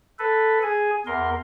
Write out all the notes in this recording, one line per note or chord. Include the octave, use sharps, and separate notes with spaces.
A4 B4
G#4 G#5
E2 A#4 C6